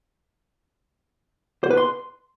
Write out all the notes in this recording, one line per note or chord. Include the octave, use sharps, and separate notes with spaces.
C5
B4
C6